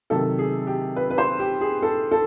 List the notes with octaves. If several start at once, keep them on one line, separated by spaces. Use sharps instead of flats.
C3 D#3 F#3 A4
G#4
G4
B4
B4
C5
G4
G#4
A4
A4